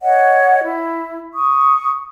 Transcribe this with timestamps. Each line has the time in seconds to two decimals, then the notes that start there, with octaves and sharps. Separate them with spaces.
0.01 C#5 D#5 F#5
0.63 E4
1.34 C#6 D#6